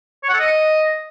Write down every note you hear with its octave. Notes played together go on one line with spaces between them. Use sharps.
C#5
F#5
A4
D#5